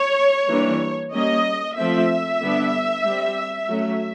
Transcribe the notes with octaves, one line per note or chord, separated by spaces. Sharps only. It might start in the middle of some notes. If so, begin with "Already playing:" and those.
Already playing: C#5
E3 G3 A#3 D4
G3 A#3 C#4 D#5
F3 A3 C4 E5
D3 G3 B3 D4
G3 C4
F#3 A3 C#4